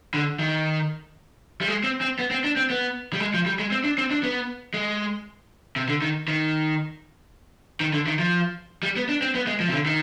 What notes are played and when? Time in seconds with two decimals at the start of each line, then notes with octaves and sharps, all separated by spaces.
0.14 D3
0.39 D#3
1.61 G3
1.68 G#3
1.84 C4
2.01 C4
2.19 B3
2.31 C4
2.44 D4
2.56 C4
2.70 B3
3.13 G3
3.20 G#3
3.34 F3
3.46 G3
3.59 G#3
3.72 C4
3.84 D4
3.98 C4
4.11 D4
4.23 B3
4.74 G#3
5.76 C3
5.89 D3
6.02 D#3
6.28 D#3
7.80 D#3
7.93 D3
8.07 D#3
8.19 F3
8.83 G3
8.96 B3
9.09 D4
9.22 C4
9.35 B3
9.47 G#3
9.60 F3
9.69 C3
9.73 D3
9.86 D#3